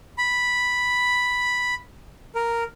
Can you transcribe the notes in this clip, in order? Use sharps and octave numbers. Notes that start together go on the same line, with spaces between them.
B5
A#4